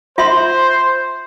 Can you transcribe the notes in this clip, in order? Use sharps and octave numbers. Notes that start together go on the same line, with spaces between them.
F4 C5 E5 C6